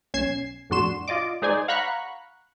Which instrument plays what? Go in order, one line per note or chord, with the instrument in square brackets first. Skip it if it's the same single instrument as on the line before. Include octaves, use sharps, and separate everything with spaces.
[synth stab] B1 C#4 G#6 C7 E7
F2 A2 D4 F#4 C6 E7
F4 D5 D#5 D6
G#3 D#4 G#4 C5 D5 G#5
F5 F#5 A#5 B5 C#6 F#6